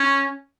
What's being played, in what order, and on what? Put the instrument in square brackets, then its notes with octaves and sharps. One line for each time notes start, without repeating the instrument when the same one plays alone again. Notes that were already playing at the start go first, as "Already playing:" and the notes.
Already playing: [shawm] C#4